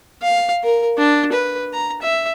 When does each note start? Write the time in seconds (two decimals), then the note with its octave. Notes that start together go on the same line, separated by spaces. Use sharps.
0.22 F5
0.64 A#4
0.98 D4
1.32 B4
1.73 A#5
2.02 E5